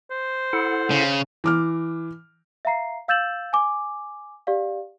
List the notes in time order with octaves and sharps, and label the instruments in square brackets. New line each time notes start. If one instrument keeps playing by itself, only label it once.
[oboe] C5
[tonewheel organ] E4 A4 F#5
[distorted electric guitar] C#3
[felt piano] E3 D6 F6
[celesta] E5 F5 A#5 C7
F5 E6 G6 A6 E7 F#7
G#5 D6
G4 D5 F5